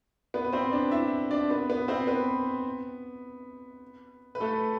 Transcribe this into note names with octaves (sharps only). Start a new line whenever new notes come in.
B3 B4
B4
C4 C5
D4 D5
E4 E5
D4 D5
B3 B4
B3 B4
C4 C5
B3 B4
B4
A3 A4